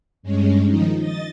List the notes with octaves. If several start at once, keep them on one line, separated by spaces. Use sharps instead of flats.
G2 G#3 C#4
D#3 F3 D#4
D#5 A6